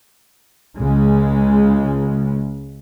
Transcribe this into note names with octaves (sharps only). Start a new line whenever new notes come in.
C#2 C#3 G#3